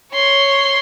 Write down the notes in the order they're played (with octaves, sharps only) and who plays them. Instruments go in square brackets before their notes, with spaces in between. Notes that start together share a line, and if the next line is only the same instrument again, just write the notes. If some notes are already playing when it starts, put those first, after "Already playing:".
[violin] C#5 C6